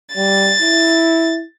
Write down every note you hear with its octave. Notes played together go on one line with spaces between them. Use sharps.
G3 A6
E4